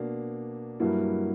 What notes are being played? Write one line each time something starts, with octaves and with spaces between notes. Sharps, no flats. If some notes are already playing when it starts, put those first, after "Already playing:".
Already playing: B2 A#3 D4
G2 F#3 A#3 E4